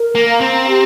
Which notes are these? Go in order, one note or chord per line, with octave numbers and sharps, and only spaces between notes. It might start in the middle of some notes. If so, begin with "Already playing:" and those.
Already playing: A#4
A#3
F5 A#5
C4
G4